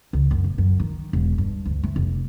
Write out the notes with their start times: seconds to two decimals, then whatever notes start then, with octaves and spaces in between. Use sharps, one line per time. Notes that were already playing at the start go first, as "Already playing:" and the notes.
0.13 C#2
0.31 F#2
0.44 D#1
0.58 F#2
0.80 D#3
1.13 E1
1.38 G2
1.65 D2
1.83 A3
1.96 F1